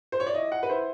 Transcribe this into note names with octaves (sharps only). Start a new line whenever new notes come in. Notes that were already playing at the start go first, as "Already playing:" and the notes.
C5
C#5
D5
E4 D#5
F#5
B4
E4 C5